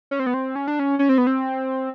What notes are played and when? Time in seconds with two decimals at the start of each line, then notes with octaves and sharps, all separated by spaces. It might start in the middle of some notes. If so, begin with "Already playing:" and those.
0.11 C#4
0.20 C4
0.26 B3
0.34 C4
0.55 C#4
0.68 D4
0.79 C#4
0.99 C#4
1.09 C4
1.18 B3
1.27 C4